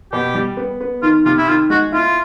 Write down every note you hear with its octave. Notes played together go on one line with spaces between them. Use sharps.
B2 G4
G3
B3
B3
D#3 F4
C3 F4
E4
D#3 F4
G#3 F#4
E4 F4